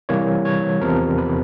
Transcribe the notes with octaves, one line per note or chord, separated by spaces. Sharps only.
C3 E3 G3 A#3 C#5
C#5
E2 C3 F3 A#4
B4